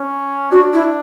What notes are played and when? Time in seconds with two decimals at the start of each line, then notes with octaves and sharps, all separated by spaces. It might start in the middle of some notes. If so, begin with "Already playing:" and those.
Already playing: C#4
0.51 D4 F#4
0.73 E4